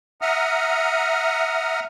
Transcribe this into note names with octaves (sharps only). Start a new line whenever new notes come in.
E5 F#5 A#5 D#6 F6